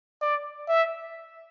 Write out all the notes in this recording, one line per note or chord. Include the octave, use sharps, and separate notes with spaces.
D5
E5